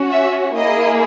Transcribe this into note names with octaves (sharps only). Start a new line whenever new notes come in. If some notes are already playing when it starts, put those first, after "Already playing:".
Already playing: C#4 F#4
E5
A#3 E4 G#4 D#5